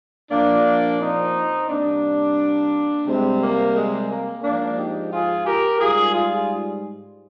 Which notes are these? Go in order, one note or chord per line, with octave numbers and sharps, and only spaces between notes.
A#2 F3 A#3 D4
C4 D#4
C3 G3 A#3 D4
C3 G3 G#3 C4
A#3
G#3
A#3
G#2 F3 A#3 D4
D#4 G4
F4 G#4
G4 A#4
G#2 G3 F4 G#4
F4 G#4